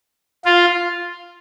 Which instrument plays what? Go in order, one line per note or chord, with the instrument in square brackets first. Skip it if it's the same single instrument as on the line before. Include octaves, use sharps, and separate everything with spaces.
[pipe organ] F4